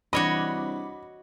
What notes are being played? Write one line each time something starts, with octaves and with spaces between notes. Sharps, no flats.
C2 E3 D4 F#4 C#5 D#5 B5 D6